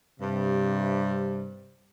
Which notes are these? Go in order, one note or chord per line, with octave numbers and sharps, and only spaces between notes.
G2 C3